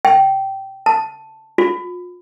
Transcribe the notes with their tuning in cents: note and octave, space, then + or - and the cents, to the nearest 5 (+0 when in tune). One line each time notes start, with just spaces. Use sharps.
G5 -15
A5 +0
F4 +35